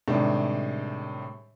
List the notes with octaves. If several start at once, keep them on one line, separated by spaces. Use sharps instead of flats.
A2 C3 D#3 G3 G#3 D4